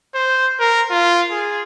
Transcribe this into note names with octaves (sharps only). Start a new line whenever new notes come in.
C5
A#4
F4
G#4